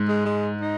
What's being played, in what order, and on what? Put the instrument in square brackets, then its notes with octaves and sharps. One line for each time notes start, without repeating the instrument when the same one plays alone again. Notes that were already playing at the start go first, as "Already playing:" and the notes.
Already playing: [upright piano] G#2
[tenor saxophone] G#3
G#3
D#4